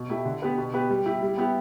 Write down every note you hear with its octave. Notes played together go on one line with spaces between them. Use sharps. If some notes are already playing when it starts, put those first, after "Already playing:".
Already playing: B2
A3 E4 G4
D3
B3 G4 B4
B2
B3 G4 B4
G3
E4 G4
G3
B3 E4 G4